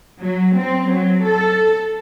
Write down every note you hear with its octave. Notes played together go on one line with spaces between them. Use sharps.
F#3
C4
F#3
A4